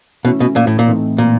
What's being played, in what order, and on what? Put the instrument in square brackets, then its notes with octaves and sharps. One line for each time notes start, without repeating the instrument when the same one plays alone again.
[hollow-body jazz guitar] B2 [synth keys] E3 A3 C#4 E4
[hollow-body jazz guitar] B2
A#2
A2
A#2
[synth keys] A2 E3 A3 C4 D#4
[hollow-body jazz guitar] A#2